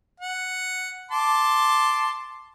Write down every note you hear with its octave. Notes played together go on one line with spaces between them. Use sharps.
F#5
A5 C6 D6